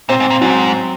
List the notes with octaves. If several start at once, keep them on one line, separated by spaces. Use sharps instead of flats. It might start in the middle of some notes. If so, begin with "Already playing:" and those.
A#2 C4
G#2
A#2
G#2 F#3